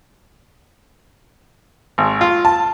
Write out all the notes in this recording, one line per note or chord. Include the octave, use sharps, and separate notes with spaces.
G#1
F4
A5